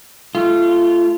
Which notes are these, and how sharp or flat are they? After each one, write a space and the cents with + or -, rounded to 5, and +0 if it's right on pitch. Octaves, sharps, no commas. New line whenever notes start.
A3 -15 F4 -25